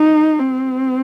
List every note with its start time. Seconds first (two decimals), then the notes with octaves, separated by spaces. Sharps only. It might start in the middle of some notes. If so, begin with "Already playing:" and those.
Already playing: D#4
0.40 C4